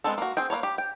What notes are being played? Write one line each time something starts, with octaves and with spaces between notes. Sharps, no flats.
G#3 B3 C4 A4
A#3 F#4
C4 G#4 G5
A#3 D4 B4 C#5
G4
G5